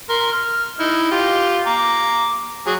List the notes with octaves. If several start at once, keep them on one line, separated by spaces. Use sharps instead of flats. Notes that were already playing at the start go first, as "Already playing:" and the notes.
A#4 C6
F6
D#4 E4
F4 G4
A#5 D6
F#3 G#4